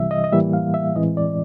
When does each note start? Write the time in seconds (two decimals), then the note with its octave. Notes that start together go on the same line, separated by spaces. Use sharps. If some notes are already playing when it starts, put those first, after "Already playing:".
Already playing: C2 C3 E3 G3 E5
0.11 D#5
0.24 D#5
0.32 A2 E3 G3 A#3 E5
0.53 F5
0.74 E5
0.95 A2 E3 G#3 C4 D#5
1.17 D5